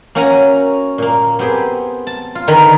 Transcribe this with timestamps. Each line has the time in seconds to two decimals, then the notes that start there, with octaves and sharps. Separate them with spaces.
0.15 A#3 C#4 F#4 F#5 G#5 A#5
0.98 A#2 A#3
1.39 B3 C4 G4 G#4
2.07 A5
2.35 F4
2.47 D3 D#3 A#4 B4 A#5